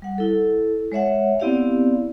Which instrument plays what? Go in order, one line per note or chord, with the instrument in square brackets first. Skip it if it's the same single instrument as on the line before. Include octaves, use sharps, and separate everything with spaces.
[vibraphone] G3 F#5
E4 A4
G#3 C#5 E5 F#5
B3 C4 E4 G4 D5 F5